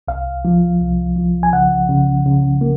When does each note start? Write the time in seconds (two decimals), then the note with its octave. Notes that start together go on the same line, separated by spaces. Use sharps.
0.08 C2 F5
0.45 F3
0.81 C2
1.16 F3
1.43 G#5
1.53 C#3 F#5
1.89 C#3
2.26 C#3
2.61 A#3